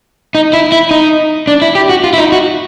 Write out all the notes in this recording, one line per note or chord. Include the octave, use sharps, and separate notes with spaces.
D#4
E4
E4
D#4
D4
E4
G4
F#4
F4
E4
D#4
F#4